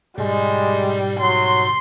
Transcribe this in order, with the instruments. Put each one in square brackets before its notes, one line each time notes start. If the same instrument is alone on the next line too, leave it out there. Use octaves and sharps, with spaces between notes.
[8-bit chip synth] G#2 B2 [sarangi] G3 [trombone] G#3
[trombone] F#3 [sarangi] C6